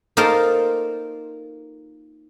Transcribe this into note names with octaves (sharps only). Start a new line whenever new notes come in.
A#3 D#4 F4 A4 A#4 C5